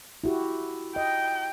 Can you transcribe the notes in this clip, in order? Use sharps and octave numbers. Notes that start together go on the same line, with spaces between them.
E4 F#4 G4
D#5 G5